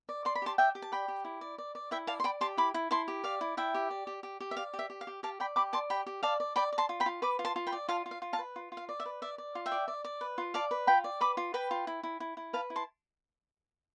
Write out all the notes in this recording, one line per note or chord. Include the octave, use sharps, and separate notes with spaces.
D5
D5 C6
B5
G4 A5 C6
G4 E5 G5
G4
A5
D5 G5 B5
G4
E4
D5
D5
D5
E4 E5 G5
D5 F5 A5
C6
D5 G5 B5
G4 A5 C6
E4 B5 D6
E4
E4 A5 C6
G4
D5 F5
E4
E4 E5 G5
G4
D5
G4
G4
G4
E5
D5 F5
G4
E5
G4
F5
G4
G4 F5 A5
D5 G5 B5
G4 B5 D6
D5 A5 C6
G4 G5 B5
G4
D5 F5 A5
D5
D5 G5 B5
D5
A5 C6
F4
G5 B5
F4
B4 B5 D6
F4
A5 C6
F4
G5 B5
D5
F4 F5 A5
F4
F5
F4
F5 A5
B4
F4
F4
F5
D5
E5
B4
D5 E5
D5
F4
E5 G5
D5
D5
D5
B4
F4
D5 F5 A5
B4
F4 G5 B5
D5
B4 B5 D6
F4
B4 G5 B5
F4
E4
E4
E4
E4
B4 F5 A5
E4
A5 C6